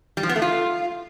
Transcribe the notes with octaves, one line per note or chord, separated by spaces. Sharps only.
G3
F3
B3
A3
F4